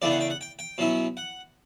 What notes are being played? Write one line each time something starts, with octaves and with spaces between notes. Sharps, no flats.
E2 C#3 E3 A3 D4 D5
F#5
G5
F#5
G5
G5
B2 F#3 C#4 E4
F#5